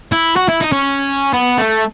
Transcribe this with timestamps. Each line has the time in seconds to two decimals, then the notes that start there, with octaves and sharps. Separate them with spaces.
0.12 E4
0.36 F#4
0.49 E4
0.61 D#4
0.72 C#4
1.33 B3
1.58 A3